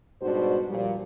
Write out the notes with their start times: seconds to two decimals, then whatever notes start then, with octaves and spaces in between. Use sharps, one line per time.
0.21 G#2 B2 G3 D4 F#4 C5
0.70 A#2 F3 G3